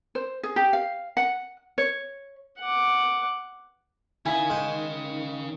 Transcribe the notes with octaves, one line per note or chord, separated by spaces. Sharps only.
C5
G#4
G4
F5
F#5
C#5
F#5 D6
D#3 C#4 E4 D#5 F5 G#5
G#3 G5